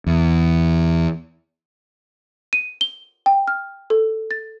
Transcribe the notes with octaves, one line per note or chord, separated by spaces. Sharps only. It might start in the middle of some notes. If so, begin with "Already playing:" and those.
E2
D#7
G7
G5
F6
A4
A6